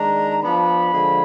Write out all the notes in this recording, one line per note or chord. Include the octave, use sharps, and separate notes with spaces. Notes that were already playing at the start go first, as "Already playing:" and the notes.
Already playing: D#3 G#3 D4 A#5
F3 B3 D4 B5
D3 F3 G#3